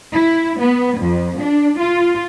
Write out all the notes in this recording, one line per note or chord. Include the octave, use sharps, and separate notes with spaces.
E4
B3
F2
D4
F4